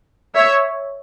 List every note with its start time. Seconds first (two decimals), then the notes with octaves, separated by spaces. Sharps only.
0.35 C#5 E5